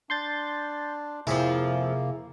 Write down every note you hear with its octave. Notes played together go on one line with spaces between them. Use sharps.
D4 C6 G6 A6
F2 C3 F3 A#3 E4 G#4 E5